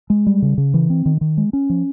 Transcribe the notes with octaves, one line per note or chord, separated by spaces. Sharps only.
G#3
G3
C#3
C#3
E3
C4
D#3
D#3
G#3
C#4
F3